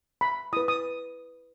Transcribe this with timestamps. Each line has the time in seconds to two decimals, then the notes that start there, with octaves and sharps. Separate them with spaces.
0.21 B5
0.53 E4 B4 D#6
0.68 D#6